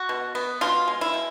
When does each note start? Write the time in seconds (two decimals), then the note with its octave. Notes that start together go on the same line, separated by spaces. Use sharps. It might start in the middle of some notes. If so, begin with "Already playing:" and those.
Already playing: F#4
0.09 B2
0.35 B3
0.61 B2 F4
0.88 G#3
1.01 E4
1.14 B2